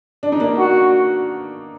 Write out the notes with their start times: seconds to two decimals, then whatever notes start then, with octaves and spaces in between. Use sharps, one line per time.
0.23 D4
0.32 D#4
0.40 A#3 D4
0.58 F#4